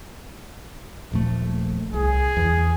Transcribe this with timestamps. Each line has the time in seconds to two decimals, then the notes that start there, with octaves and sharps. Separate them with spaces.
1.12 D#1 A#1 A3
1.94 C2 G#4
2.37 E2